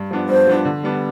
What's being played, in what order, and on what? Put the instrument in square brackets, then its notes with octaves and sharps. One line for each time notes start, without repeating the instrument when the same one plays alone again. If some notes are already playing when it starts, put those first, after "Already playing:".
Already playing: [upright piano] G2
F3 B3 D4
[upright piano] G2 [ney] C5
[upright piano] F3 B3 D4
D3
G3 B3 D4